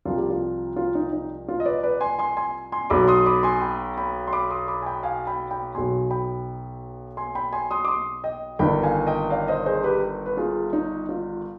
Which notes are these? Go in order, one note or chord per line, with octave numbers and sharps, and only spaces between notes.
C2 C3 F3 F4
G4
F4
F4
D#4
D#4
F4
D#5
B4 D5
B4 D5
G#5 C6
G#5 C6
G#5 C6
G#5 C6
B1 B2 B5 D6
C6 D#6
B5 D6
G#5 C6
G5 B5
G5 B5
C6
B5 D6
C6 D#6
B5 D6
G#5
G5 B5
F5 G#5
G5 B5
G5 B5
B1 B2 G#5 C6
G5 B5
G#5 C6
G5 B5
G#5 C6
C6 D#6
D6
C6 D#6
D#5 G5
G1 G2 D#3 G5 B5
F5 G#5
D#5 G5
D5 F5
C5 D#5
G#4 C5
G4 B4
B4
F4 G#4
D#4
F4